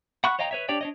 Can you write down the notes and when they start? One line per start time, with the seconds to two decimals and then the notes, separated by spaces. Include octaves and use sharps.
0.24 F#5 B5 C#6 F#6
0.39 C#5 D#5 F5 G5 A#5
0.51 B4 C#5 E5
0.69 D4 G4 C#5 D5 G5
0.81 D4 C#5 D#5